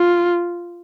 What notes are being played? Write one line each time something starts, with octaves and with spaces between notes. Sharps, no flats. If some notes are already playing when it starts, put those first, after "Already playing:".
Already playing: F4